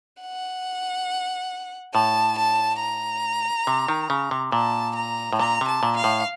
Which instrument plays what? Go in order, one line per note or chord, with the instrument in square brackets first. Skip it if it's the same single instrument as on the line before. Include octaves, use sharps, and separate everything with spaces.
[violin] F#5
[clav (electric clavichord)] A2 [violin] A5
[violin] A5
A#5
[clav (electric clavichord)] C3
D#3
C#3
C3
[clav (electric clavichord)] A#2 [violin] A5
[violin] A#5
[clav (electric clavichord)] A2
[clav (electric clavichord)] A#2 [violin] A#5
[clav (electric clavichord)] C3
[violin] A5
[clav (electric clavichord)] A#2
[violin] F5
[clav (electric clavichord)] A2